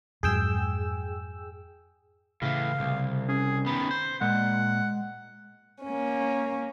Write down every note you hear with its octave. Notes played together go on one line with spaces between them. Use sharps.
F2 G#2 F#3 G#4 G5 E6
A2 C#3 E3 F5
C2
C#4 G#4
D#3 B3 B5
C5
A#2 G#3 F#5
A#3 C#4